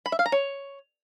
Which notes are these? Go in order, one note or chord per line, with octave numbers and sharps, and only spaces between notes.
B5
E5
F5
A#5
C#5